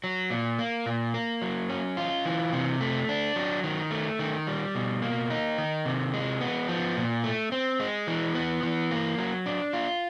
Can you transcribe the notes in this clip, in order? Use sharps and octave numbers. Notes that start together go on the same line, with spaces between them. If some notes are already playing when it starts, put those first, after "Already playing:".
F#3
A#2
A#3
A#2
A#3
F#3
C#4
F4
E3
C3
A3
D4
F#3
D#3
A3
D#3
G3
B2
A#3
D#4
D#3
C3
G#3
B3
F3
A#2
A3
C4
G#3
E3
B3
E3
A#3
F#3
D4
F4